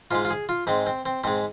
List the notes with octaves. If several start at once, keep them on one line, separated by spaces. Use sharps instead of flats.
G#2 G#3 F4
F4
G#4
F4
G#2 G#3 C4
C4
C4
G#2 G#3 C4